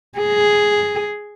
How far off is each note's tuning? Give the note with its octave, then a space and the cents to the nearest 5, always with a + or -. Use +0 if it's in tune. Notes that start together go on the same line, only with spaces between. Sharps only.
G#4 +0